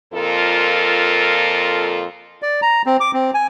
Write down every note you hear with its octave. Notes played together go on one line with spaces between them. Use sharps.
F2 A#2 F4 A4 A#4
D5
A#5
C4
D6
C4
G#5